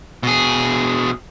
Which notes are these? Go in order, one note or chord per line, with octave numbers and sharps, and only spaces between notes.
B2 G#4